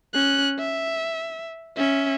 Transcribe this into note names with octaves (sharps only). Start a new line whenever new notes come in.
C#4 F#6
E5
C#4 E5